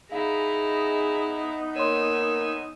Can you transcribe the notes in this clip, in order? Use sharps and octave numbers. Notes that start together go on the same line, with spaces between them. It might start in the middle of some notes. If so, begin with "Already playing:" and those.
B3 D#4 E4 G#4 F5 A#5
A#3 C#5 G#5 C6 E6